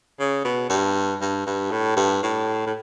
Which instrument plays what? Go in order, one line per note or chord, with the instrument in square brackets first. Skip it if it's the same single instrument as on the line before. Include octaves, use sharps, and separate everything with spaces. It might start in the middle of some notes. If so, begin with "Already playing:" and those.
[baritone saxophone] C#3
B2
G2
G2
G2
A2
G2
A2
A2